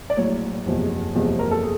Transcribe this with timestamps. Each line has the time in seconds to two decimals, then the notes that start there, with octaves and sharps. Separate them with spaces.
0.10 D5
0.17 A#1 A2 F#3 C#5
0.65 F#1 E2 C3 F3 G#3
1.15 F#1 E2 C3 F3 G#3
1.39 A#4
1.51 A4
1.63 G#4